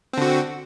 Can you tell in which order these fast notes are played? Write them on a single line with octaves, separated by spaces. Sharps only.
C4 D3 F#4